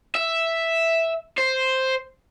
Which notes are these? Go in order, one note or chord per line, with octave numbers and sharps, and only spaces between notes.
E5
C5